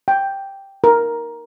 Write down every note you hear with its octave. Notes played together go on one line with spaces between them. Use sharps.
G5
A#4